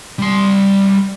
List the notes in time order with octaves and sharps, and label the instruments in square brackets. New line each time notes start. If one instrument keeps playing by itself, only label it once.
[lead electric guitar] G3 C6